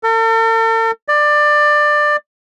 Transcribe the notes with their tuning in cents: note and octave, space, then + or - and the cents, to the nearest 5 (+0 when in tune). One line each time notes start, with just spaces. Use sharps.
A4 +45
D5 +20